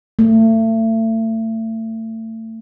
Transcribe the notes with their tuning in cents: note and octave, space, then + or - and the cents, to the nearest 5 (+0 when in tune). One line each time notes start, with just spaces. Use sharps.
A3 +30